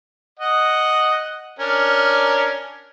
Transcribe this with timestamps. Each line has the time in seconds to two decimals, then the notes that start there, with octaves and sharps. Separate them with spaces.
0.40 D#5 F#5
1.59 C#4 D4 A#4